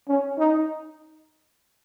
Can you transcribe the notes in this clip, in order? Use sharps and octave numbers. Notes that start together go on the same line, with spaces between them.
C#4
D#4